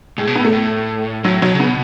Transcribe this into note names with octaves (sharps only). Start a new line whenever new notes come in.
A2 G#3
B2
A2 B3
A3
A2
A2 F#3
B2 F#3
C#3
B3
B2